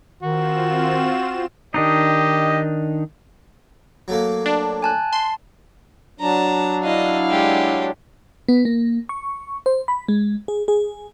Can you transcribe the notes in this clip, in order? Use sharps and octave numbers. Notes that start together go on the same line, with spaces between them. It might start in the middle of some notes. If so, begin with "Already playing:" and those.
D#3 C4 F4 F#4 E7
D#3 D4 D#4 G4 D#5
F#3 A3 A#3
D4
G#5 A5 F#6
A5 C6
F#3 D4 A5 A#5
E4 D#5 F5
G#3 G4
B3
A#3
C#6
C5
B5
G#3
G#4
G#4